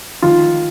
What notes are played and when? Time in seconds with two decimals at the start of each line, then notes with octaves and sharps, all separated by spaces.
0.22 D#3 F4